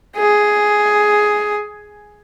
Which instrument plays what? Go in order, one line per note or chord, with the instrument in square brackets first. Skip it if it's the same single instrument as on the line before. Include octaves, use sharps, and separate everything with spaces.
[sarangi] G#4